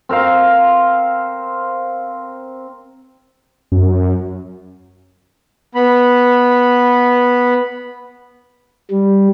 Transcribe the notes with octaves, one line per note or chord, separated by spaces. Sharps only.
C4 A#4 C5 F5
F#2
B3 B5
G3